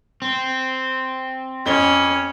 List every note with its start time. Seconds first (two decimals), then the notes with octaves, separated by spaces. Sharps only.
0.22 C4
1.66 F2 C#4 G7